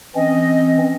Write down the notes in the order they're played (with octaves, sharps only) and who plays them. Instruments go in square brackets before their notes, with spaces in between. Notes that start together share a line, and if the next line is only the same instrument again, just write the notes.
[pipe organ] E3 C4 C#4 [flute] D#5